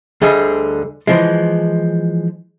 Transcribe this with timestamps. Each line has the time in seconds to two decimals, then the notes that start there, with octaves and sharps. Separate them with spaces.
0.22 D2 D3 G3 G#4 D#5
1.07 E3 F3 G#3